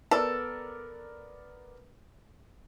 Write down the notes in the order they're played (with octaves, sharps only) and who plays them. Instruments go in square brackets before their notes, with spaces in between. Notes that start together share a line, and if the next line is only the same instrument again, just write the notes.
[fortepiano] B3 A#4 D5 [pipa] A4